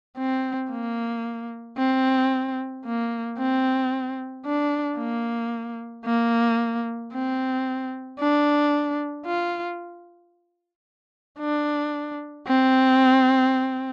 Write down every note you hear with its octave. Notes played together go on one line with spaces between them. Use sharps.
C4
A#3
C4
A#3
C4
D4
A#3
A#3
C4
D4
F4
D4
C4